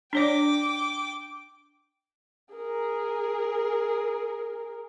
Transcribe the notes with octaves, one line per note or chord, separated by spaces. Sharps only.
D4 C#5 D5 G5 D6
G#4 A#4